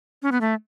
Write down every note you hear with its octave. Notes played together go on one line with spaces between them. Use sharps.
C#4
B3
A3